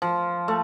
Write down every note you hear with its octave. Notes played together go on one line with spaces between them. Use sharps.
F3
A3